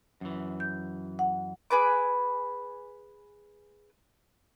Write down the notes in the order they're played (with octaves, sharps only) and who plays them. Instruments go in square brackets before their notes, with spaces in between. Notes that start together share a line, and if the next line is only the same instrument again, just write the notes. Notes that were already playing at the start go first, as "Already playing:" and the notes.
[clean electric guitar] F#2 E3
[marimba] G6
F#5
[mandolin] G#4 B4 D6